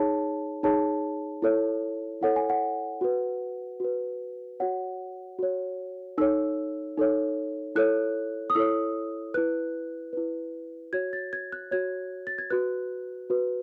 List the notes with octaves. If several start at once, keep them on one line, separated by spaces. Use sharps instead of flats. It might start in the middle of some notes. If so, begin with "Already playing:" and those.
Already playing: D#4 G#4 C#5 A5
D#4 G#4 C#5 A5
E4 A4 C#5
E4 A4 C#5 F#5
G#5
F#5
F#4 B4
F#4 B4
F#4 C#5 F#5
F#4 C#5
D#4 A4 C#5 E6
D#4 A4 C#5
E4 A4 C#5 F#6
D#6
E4 A4 C#5 E6
E4 B4 F#6
E4 B4
F#4 C#5 G#6
A6
G#6
F#6
F#4 C#5 G#6
A6
G#6
F#4 B4 F#6
F#4 B4